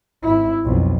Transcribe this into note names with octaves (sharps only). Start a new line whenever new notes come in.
G#1 E4
B1 F2